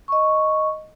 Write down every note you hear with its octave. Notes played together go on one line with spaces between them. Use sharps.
D#5 C#6